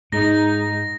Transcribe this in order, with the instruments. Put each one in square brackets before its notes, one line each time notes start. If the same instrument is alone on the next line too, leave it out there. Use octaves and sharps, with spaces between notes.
[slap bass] G#2 [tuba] G#3 [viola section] D#4 [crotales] A#6